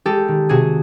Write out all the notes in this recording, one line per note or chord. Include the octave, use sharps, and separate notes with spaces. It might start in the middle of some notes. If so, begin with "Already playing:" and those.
G#3 G4 A4
D#3
C3 F#4 G#4